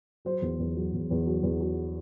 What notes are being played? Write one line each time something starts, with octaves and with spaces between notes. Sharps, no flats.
F#3 C5
E2
E2
F#3
E2
E2
F#3
E2
F#3